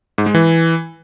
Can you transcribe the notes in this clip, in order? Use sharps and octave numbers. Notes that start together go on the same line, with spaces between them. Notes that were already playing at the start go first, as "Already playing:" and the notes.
G#2
G#3
E3